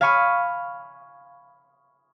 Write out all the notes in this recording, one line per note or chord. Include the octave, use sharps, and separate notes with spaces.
F5 G#5 B5 C#6 D#6 F6